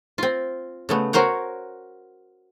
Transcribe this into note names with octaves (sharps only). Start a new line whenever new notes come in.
C4 F4
C#3 A3 B3
F#4 A#4 C5 C#5 F#5